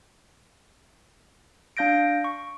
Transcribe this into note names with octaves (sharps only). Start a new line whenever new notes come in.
D4 F5 G6 A#6 D7
C#6